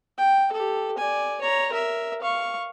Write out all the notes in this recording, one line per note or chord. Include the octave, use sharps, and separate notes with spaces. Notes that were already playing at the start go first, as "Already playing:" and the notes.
G5
G4 A4
D5 G#5
C#5 A#5
A#4 E5
F5 C#6